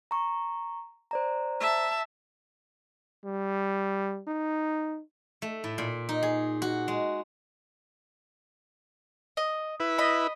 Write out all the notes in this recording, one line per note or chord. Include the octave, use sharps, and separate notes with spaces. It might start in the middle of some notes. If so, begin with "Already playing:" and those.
A#5 C#6
C5 D5 A#5
E5 A5
G3
D#4
A3
A2
A#2
D#4
G#4
F#4
G#3
D#5
E4 B4
D#5 B5